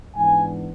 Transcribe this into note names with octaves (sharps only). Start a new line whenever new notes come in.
G#2 E3 B3 D4 G#5